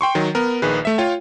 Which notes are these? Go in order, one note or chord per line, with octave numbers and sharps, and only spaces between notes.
G5 C6 C#6
D#3 F#3
B3 A#4
A#1 D#3 G#4 B4
A3 E5
F4 C#5 F5 G5